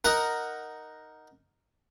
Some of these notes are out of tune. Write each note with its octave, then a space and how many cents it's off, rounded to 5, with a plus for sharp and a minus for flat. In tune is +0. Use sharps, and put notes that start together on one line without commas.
D#4 +0 A#4 +0 F#5 +0